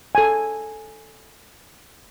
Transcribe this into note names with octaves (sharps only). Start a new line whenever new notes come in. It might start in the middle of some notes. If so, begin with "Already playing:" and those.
A4 G#5